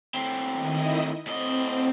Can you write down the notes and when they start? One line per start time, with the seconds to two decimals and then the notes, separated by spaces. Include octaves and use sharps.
0.14 A2 C4
0.54 D#3 E4 D#5
1.27 A2 C4 D#5